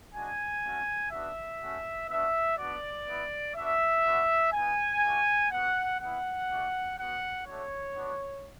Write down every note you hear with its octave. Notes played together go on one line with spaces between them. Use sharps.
G#3 D4 F#4 G#5
A3 C#4 F#4
B3 D4 F#4 E5
A3 C#4 F#4
B3 D4 F#4 E5
B3 D4 F#4 D5
B3 E4
B3 D4 F#4 E5
B3 D4 F#4
B3 E4 G#5
A3 D4 F#4
B3 F#4 F#5
B3 E4 F#5
A3 D4 F#4
B3 F#4 F#5
A3 D4 F#4 C#5
B3 D4 F#4